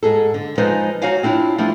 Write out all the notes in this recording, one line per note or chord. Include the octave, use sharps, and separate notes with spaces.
G#2 G#4 A4
D3
F3 G#3 D#4 B4 C5 G#5
D#4 F#4 C#5 F5 G#5
C4 D4 E4 F4
F3 G3 A3 D4 E4